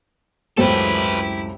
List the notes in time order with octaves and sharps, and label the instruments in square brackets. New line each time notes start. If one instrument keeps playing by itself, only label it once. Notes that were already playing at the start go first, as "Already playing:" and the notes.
[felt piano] C#2 F#2 [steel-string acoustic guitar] A2 C4 [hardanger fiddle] E4 G4 [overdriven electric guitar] A4 B4